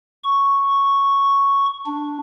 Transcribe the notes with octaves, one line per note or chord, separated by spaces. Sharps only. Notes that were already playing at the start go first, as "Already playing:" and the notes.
C#6
D4